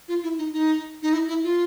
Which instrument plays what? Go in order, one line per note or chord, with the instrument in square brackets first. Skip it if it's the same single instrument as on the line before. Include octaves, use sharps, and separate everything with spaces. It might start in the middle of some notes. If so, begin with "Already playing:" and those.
[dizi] F4
E4
D#4
D#4
D#4
E4
E4
F4